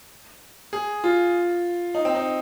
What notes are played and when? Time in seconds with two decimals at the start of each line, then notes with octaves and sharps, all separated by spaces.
0.73 G#4
1.04 F4
1.95 D#4
2.05 C4
2.15 D#4